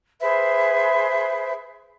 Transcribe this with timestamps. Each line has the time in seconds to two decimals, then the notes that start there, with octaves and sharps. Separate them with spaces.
0.21 G#4 B4 C5 E5